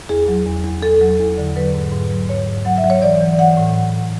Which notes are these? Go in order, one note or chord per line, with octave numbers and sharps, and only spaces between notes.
E2 G#4
F#3
E2
E2
E2 A4
F#3
E2
D3
F#3 B4
G#2
G#2
F#3
G#2 C#5
G#2
F#3 F#5
E5
F#3
C#5
E3 D5
E3
E3 F#5
A2